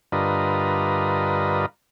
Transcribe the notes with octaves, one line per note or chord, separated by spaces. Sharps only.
G2 D3 F4 A#4 B4 D#5